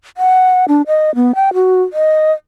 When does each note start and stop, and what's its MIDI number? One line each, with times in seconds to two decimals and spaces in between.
0.17 0.65 78
0.68 0.82 62
0.87 1.14 75
1.15 1.35 59
1.35 1.54 79
1.54 1.82 66
1.93 2.32 75